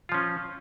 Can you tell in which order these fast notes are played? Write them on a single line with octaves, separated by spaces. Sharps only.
F4 F3 C#4